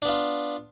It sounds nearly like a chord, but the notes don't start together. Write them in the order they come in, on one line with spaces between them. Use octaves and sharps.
D4 B3 F4